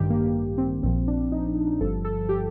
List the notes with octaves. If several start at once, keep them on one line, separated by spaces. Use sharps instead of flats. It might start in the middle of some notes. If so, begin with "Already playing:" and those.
Already playing: A1 G2 D#3 G4
A#3
C4
A#1 A#2 F3 C4
D4
D#4
G1 G2 F3 A4
A4
G4